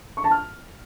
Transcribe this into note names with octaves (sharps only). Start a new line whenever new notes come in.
C#6
A5
F6